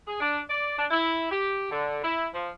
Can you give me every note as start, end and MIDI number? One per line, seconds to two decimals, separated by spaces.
0.07 0.17 68
0.21 0.39 62
0.49 0.76 74
0.78 0.86 62
0.91 1.30 64
1.31 1.68 67
1.71 1.98 50
2.03 2.26 64
2.33 2.48 53